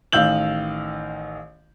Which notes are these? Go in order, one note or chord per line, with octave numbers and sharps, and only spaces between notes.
A1 D#3 F5 E6 G6 F#7